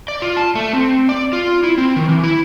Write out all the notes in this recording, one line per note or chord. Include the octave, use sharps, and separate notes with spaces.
D5
F4
A5
A3
C4
D5
F4
E4
C4
D#3
E3
E4